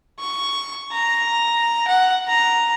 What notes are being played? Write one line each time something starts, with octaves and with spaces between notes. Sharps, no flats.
C#6
A#5
F#5
A#5